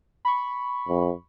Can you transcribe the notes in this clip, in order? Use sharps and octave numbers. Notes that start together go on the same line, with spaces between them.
B5 C#6
F2